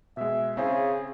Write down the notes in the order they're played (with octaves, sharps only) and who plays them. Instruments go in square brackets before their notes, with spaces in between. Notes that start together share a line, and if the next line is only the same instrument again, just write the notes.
[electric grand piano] B2 G#3 [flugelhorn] E5
[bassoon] C#3 [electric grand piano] C4 E4 C5 [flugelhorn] G#4